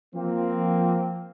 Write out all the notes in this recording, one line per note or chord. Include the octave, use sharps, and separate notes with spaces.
F3 A#3 C4